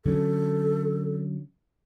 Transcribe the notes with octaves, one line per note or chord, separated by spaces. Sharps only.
D3 F#3 C#4 A4